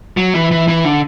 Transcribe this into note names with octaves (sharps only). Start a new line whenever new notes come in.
F#3
E3
E3
E3
D3